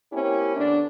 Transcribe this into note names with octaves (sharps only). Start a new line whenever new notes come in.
A#3 C4 C#4 E4 G4
D3 B3 D4